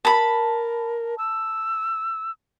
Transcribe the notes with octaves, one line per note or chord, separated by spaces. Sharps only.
A#4 A5 B5
E6